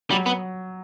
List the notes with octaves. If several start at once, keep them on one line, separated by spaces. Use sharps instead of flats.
F#3 G3
B3